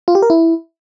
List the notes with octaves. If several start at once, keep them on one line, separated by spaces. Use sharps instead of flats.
F4
G4
A#4
E4